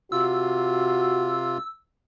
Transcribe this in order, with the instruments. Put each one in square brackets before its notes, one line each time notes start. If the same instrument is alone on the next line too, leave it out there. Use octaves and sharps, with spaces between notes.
[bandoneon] C3 F4 [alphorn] F#4 [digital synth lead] E6